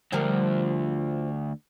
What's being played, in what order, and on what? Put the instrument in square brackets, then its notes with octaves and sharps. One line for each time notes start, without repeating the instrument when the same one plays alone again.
[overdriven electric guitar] D2 D3 [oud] F3 G3 A#4